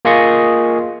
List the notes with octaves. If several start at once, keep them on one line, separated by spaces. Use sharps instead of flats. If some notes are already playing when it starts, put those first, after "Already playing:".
A#3 F4 G#4 D#5 C#6 D#6